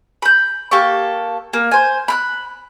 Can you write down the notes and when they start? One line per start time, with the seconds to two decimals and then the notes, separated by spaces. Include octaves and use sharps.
0.22 B5 G6
0.71 A#3 G4 A4 C#6
1.53 A#3
1.71 C5 G#5
2.08 B5 F6 F#6